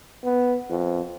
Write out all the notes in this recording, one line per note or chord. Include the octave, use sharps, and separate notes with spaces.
B3
F2